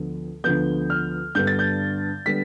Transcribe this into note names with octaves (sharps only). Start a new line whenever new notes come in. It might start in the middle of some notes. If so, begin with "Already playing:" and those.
Already playing: D2 D3 F3 B3
D2 D3 F3 B3 G6
F6
G2 D3 G3 B3 G6
A6
G6
D3 G3 B3 B6